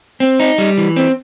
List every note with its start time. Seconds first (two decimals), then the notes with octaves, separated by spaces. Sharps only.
0.20 C4
0.40 D#4
0.58 G3
0.77 E3
0.96 C4